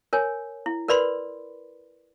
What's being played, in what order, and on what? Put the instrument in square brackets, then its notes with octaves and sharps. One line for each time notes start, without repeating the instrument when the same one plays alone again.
[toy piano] A#4 C#5 G#5
E4
A#4 B4 D5 B5 C6